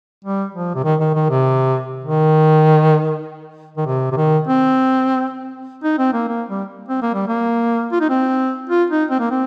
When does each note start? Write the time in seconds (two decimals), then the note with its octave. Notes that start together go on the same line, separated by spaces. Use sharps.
0.24 G3
0.55 F3
0.75 C3
0.84 D#3
1.00 D#3
1.14 D#3
1.30 C3
2.05 D#3
3.77 D#3
3.86 C3
4.12 C3
4.17 D#3
4.47 C4
5.83 D#4
5.98 C4
6.13 A#3
6.28 A#3
6.49 G3
6.88 C4
7.02 A#3
7.14 G3
7.28 A#3
7.92 F4
8.01 D#4
8.09 C4
8.69 F4
8.90 D#4
9.10 C4
9.19 A#3
9.30 C4